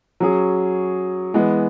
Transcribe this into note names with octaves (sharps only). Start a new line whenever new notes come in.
F#3 C#4 G#4
E3 G#3 B3